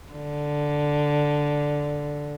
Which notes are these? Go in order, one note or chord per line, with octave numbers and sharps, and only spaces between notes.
D3